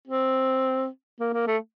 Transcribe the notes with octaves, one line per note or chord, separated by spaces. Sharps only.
C4
A#3
A#3
A3